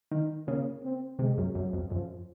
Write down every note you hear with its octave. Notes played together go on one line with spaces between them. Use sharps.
D#3
C#3 A#3
C4
C3 G#3
F#2
F#2 F#3
F2
F#2 F3